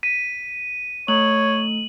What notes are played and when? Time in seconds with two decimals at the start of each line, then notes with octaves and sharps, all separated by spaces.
0.03 B6 D#7
1.08 A3 C#5 F#7